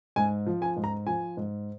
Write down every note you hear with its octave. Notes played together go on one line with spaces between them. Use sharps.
G#2 G#5
F3
G#5
G#2
A#5
F3 G#5
G#2